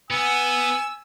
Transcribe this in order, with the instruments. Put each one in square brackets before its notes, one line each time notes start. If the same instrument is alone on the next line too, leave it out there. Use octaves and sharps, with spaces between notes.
[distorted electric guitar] B3 [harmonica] G#5 E6